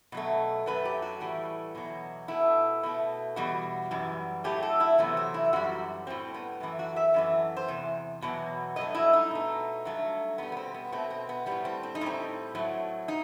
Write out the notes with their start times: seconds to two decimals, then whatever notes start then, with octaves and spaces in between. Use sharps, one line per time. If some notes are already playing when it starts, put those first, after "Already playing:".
0.12 B2 F#3 A3
0.66 F#2 F#3 A3 B4
0.85 G4
1.02 F#4
1.20 A2 E3 G3
1.75 E2 B2 F#3
2.28 B2 A3 E4
2.83 B2 A3
3.36 E2 B2 G3 F#4
3.91 F#2 E3 G3
4.44 A2 F#3 A3 G4
4.63 A4
4.80 E4
4.98 E2 C3 F#3 A3 B3
5.17 C4
5.34 E4
5.53 F#2 E3 G3 F#4
6.07 A2 G3 C4
6.34 B3
6.60 F#2 E3 A3
6.79 F#4
6.96 E5
7.14 F#2 E3 A3
7.57 C5
7.68 E2 C3
8.22 E2 B2 F#3
8.76 G2 F#3 A3 D#5
8.95 E4
9.13 D#4
9.31 B2 A3
9.85 G2 F#3 A3
10.38 B2 G3 B3
10.52 B3
10.57 C4
10.74 B3
10.92 B2 A3 C4
11.10 C4
11.29 B3
11.46 A2 G3 B3
11.65 C4
11.83 C4
11.95 D#4
12.01 A2 G3 C4
12.55 A2 F#3 A3
13.08 D#4